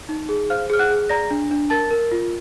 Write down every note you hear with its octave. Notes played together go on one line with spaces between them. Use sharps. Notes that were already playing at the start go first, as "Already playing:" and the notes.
D#4
G#4
C5 F5 F6
G#4 F6
F#5 F#6
G#4
D5 A#5 A#6
D4
D4
A#4 A5 A6
A#4
F4